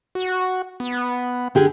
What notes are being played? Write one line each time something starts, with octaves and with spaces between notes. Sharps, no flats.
F#4
B3
D3 G4 G#4